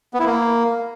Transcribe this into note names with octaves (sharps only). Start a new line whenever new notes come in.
B3
E4
A#3